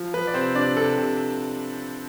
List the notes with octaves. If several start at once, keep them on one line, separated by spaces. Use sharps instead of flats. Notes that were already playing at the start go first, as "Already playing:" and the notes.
Already playing: F3
F3 B4
D5
C3 C4 C5
C3 D4 D5
C3 A4
C3